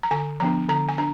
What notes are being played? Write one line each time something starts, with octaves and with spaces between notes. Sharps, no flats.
A#5
D3 G#5
F3 B3 D4 A#5
D3 A#5
G#5
D4 A#5